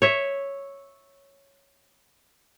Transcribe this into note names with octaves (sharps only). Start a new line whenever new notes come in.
C#5 E5